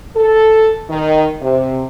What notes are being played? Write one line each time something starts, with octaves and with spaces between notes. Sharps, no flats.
A4
D#3
C3